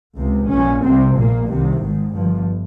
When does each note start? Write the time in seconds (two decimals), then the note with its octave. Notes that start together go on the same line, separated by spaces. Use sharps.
0.16 C#2 C3
0.49 A#1 A#2 C#4
0.81 C2 C3 C4
1.14 A#1 A#2 A#3
1.48 C2 C3 D#3
1.80 G#1 G#2
2.13 G1 G2 F3